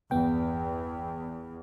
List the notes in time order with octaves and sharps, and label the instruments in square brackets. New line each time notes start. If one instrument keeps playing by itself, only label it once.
[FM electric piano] G1 B3 G5 [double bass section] E2